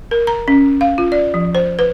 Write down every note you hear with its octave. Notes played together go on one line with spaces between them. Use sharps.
A#4
A#5
C#4
F5
F4
D5
F3
C5
B4